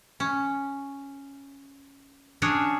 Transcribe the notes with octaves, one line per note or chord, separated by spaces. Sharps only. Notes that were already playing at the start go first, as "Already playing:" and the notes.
C#4
C#4 D4 F#4 G#4 C#5